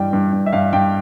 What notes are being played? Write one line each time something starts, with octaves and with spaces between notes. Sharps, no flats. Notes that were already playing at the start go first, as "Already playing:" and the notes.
Already playing: G2 E3 G3 G5
G2
G2
E5
G2 F5
G2 G5